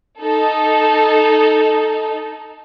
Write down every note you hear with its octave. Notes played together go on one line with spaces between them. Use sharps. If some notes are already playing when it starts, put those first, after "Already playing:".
D#4 A4